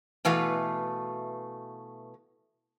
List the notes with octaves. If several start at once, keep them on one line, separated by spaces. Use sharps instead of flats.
B2 E3 A3 B4 F5